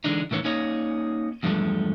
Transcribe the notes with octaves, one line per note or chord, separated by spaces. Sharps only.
D3 E3 G3 G#3 D4 D#4
A2 D#3 E3 C#4
A#3 C#4 D#4 G#4 C#5 D#5
E2 G2 E3 F3 G#3 A3